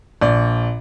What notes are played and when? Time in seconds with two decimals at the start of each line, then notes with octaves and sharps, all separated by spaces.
0.21 A#1 D5